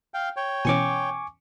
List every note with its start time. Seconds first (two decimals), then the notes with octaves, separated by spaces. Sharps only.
0.14 F5 G5
0.37 C#5 G5
0.65 B2 E3 C#4 G#5 C#6 D6